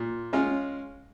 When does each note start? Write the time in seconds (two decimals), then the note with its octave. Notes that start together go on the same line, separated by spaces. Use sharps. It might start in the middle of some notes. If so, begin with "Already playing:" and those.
Already playing: A#2
0.33 G#3 C#4 F4